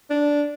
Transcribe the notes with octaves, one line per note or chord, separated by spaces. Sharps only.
D4